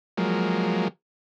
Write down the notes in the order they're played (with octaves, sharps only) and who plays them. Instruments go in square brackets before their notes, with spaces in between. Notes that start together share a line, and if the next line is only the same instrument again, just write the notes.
[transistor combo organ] F3 F#3 G#3 A#3